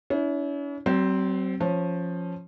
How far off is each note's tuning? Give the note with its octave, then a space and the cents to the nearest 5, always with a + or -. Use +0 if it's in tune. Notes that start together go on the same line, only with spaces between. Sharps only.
C#4 +40 E4 -25
F#3 +45 C4 +0
F3 +0 C#4 -15